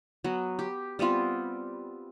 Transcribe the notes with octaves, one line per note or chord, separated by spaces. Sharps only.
F#3 B3
G4
G3 B3 C4 F4